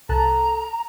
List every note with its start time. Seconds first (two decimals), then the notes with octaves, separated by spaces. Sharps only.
0.09 C2 A4 A5 A#5 F#6